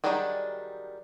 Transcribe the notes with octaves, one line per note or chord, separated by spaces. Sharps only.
D#3 F#3 G3 D4 G#4